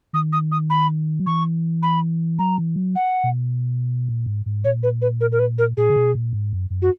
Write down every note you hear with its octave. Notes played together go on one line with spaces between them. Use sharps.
D#3 D#6
D#6
D#6
B5
F#3
E3 C#6
B5
F#3 A#5
E3
F#3
F#5
B2
A#2
G#2
G#2
A#2 C#5
B4
B4
A#4
A#4
B4
A#4
A#2 G#4
C#3
B2
A#2
G#2
F#2
F#2
F#4